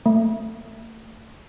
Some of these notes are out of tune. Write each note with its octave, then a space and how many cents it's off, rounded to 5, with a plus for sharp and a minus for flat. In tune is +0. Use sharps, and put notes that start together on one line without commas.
A3 +30